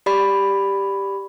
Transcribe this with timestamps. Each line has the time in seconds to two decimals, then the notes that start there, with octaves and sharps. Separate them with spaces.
0.06 G4 D5 B5